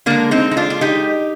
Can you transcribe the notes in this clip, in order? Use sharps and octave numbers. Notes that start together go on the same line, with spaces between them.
D3 G#3 A#3 D4
C4 D#4
D#4
D4 F4
F4
D#4 G4